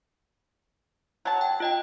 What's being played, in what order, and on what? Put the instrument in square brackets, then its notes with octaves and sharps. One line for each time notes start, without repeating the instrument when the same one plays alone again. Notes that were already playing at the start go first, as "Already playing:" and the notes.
[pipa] F#3 A5
[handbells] G5
F4 D#5 G5